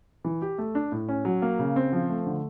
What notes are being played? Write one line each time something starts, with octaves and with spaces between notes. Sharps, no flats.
E3
G4
A3
D4
A2
C#4
F#3
A#3
C#3
C4
F3
A3
D3